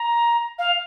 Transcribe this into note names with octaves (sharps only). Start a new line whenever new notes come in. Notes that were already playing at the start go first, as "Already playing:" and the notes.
Already playing: A#5
F5